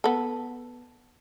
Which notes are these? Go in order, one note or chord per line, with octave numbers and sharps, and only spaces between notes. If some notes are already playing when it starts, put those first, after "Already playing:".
B3 A4